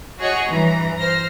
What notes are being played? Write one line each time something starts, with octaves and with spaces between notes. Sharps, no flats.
F#4 G#4 C#5 D#5 F#5
G2 E3 A#5
C5 F6 A#6